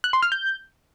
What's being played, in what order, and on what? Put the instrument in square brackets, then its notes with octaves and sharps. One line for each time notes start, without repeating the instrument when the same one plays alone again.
[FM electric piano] F#6
C6
F6
G6